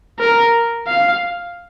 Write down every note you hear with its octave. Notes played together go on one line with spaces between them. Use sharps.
A#4
F5